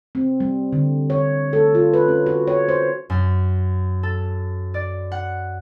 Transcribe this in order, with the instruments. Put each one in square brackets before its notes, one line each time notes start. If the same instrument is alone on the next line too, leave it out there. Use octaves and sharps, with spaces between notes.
[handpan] C4
G3
D3
C#5
A4
F4
B4
C#4
F#4
C#5
C5
[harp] F#2
A4
D5
F#5